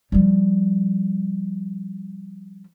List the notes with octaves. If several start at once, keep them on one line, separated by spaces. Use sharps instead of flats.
F3 G3